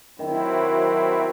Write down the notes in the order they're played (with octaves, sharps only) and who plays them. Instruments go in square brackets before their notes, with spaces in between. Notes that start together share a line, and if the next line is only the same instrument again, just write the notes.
[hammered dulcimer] D#3 [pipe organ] F#3 C4 E4